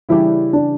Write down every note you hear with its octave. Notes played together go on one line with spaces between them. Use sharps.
C#3 E3 G3 D4 E4 G4
D4